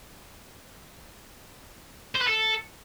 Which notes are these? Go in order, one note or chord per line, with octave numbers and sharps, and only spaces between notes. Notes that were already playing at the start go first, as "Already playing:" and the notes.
C5
B4
A4